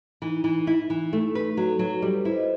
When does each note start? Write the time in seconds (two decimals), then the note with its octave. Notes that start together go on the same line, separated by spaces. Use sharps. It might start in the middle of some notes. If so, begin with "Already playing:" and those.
0.22 E3 D#4
0.44 E3
0.67 E4
0.90 E3
1.13 A3
1.35 B4
1.57 F#3 F#4
1.68 A4
1.79 F#3 B4
1.91 A4
2.02 G3 A4
2.13 B4
2.25 E4 C5
2.36 D#5